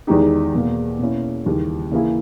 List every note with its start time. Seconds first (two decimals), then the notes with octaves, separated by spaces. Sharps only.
0.07 E2 D#3 G#3 D#4 G4
0.53 E2 B2 A#3
0.99 B2 A#3 C#4 E4
1.46 D#2 C#3 E3 G3
1.92 C#3 E3 A#3 E4 G#4